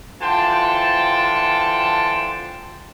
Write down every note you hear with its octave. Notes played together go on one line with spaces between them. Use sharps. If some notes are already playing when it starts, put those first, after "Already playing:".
D3 E3 F4 C5 G5 A5